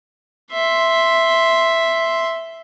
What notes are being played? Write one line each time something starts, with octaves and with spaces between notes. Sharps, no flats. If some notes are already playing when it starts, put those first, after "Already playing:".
E5 C6